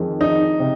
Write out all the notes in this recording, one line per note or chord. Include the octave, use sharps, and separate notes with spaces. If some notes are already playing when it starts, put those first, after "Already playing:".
Already playing: F2 D#3 G#3
D#4
C3